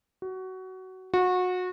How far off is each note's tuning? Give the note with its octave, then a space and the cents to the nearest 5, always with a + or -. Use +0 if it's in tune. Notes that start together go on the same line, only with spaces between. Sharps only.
F#4 +20
F#4 -25